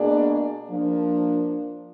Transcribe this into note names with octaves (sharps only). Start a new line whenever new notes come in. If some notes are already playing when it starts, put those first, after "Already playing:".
Already playing: B2 A#3 D4 G#4 D5
F3 A#3 D4